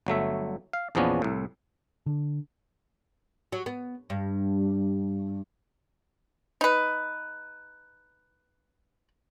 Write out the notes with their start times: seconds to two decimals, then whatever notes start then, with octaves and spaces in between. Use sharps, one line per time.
0.06 G1 F#3 A3 E5
0.73 F5
0.95 A#1 E2 F3 B3 C#4 D4
1.22 C2 A2
2.06 D3
3.52 F#3
3.66 B3
4.10 G2
6.61 D#4 B4